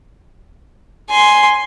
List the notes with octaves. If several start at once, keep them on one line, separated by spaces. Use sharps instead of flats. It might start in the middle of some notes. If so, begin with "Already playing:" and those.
G#5 C6